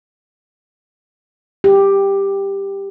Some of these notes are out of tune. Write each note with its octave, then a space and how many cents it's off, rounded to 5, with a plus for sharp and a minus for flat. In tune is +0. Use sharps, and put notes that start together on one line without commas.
G4 +10